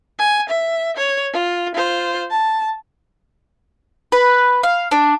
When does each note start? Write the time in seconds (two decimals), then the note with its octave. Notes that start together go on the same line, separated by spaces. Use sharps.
0.19 G#5
0.50 E5
0.97 C#5
1.33 F4
1.75 F4 C5
2.31 A5
4.12 B4
4.63 F5
4.91 D4